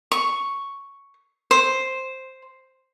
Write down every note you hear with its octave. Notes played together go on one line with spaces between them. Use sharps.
C#6
C5